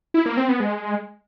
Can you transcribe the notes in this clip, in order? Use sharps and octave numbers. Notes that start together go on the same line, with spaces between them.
E4
A#3
C4
B3
G#3